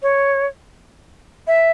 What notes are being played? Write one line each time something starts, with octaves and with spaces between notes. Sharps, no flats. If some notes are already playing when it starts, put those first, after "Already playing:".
C#5
E5